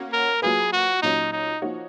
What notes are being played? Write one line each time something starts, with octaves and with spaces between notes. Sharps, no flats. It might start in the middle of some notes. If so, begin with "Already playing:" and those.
Already playing: A#3 C#4 F#4
A#4
F#3 A#3 F4 G#4 B4
F#4
A#2 F#3 C#4 D#4
D#4
F3 A#3 D#4 F#4 C#5